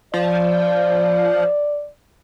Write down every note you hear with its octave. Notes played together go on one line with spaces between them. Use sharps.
F3 D5